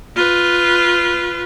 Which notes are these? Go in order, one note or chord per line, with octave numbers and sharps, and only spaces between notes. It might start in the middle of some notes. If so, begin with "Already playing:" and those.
F4 B4